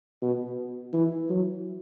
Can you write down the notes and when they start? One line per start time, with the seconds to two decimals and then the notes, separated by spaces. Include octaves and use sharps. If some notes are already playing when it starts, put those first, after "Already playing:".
0.22 B2
0.93 E3
1.29 F#3